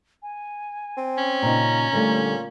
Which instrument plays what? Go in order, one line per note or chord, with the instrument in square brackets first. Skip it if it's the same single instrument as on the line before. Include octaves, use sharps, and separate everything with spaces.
[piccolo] G#5
[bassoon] C4
[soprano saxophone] C#4
[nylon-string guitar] A#2 C#3 D#4 [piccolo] A#5
[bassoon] A#2 [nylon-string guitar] D3 G3 A3